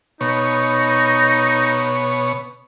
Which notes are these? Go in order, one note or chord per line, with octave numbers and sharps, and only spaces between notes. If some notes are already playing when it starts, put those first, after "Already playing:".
B2 D#4 C#5